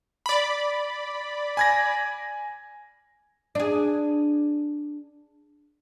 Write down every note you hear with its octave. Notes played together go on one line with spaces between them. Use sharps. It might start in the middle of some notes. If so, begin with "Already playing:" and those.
D5 B5
G#5 G#6 A#6
D4 G#4